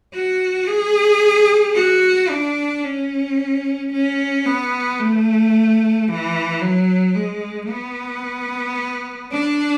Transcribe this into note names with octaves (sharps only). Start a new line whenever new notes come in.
F#4
G#4
F#4
D4
C#4
C#4
B3
A3
E3
F#3
G#3
B3
D4